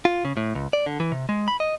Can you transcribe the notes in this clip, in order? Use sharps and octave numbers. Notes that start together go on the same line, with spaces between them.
F4
C#3
A2
C#2
D5
D3
E3
C3
G#3
B5
D#5